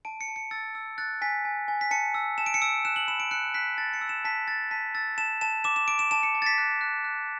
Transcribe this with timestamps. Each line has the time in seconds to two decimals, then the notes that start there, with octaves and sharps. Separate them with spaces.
0.05 A5 D7
0.21 C#7
0.28 A5
0.36 C#7
0.51 E6 A6
0.75 E6
0.98 F#6 A6
1.22 G#5 B6
1.45 G#5
1.68 G#5
1.81 B6
1.91 A5 C#7
2.14 E6
2.38 A5 E7
2.46 D7
2.54 C#7
2.62 E6 D7
2.85 F#6 E7
2.96 F#7
3.08 B5 E7
3.20 D7
3.31 F#6 C#7
3.54 F#6 B6
3.78 A5 A6
3.93 C#7
4.01 E6
4.09 E7
4.25 A5 B6
4.48 A5 A6
4.71 A5 B6
4.95 E6 A6
5.18 A5 E7
5.41 A5 E7
5.64 D6 E7
5.76 E7
5.88 D6 D7
5.99 E7
6.11 A5 E7
6.23 C#7
6.35 A5
6.42 A6
6.46 B6
6.58 F#6
6.81 F#6
7.04 F#6